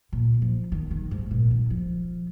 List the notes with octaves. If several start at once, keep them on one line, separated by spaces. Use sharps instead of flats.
A#2
F3
D#3
D#3
G#2
A#2
D#3
F3